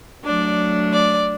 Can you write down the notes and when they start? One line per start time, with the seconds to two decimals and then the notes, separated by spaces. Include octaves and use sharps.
0.24 F#3 A3 D4 D5
0.93 D5